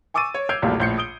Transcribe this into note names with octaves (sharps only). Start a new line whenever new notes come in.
G#5 C#6 D6 E6 A6 D#7
C#5
E6 G6 G#6 C7 D7 F7
A#1 E2 B2 G3 A3 A#3
A#1 A2 G6 C7 C#7
D#6 D7 G7